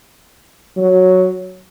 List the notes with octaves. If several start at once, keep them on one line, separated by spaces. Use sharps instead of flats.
F#3